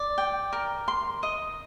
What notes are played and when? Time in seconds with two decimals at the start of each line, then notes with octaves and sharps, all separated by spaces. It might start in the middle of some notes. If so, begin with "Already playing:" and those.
Already playing: D5
0.18 G5
0.53 A#4
0.88 C6
1.23 D#5